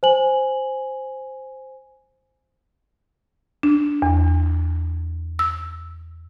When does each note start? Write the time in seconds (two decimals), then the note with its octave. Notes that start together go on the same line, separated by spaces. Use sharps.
0.03 C5 G#5 F#7
3.63 D4
4.02 E2
5.39 E6